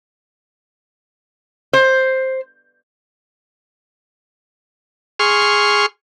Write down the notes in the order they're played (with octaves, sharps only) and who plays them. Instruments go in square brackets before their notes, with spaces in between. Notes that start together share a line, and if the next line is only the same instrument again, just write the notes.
[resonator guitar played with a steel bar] C5
[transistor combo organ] G#4 C6 C#6 F6